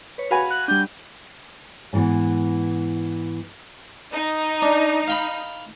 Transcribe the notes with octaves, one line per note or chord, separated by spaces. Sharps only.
B4 C#5
F#4 B4 F5 G#5
F#6
G3 D4 G6
G#2 E3 B3
D#4
D4
F5 G5 B5